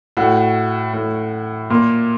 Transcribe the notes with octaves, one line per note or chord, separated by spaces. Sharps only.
A2 F#4
A2
A#2 A#3